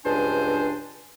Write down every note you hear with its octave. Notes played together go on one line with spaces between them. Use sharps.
C#2 G2 D4 C5 G#5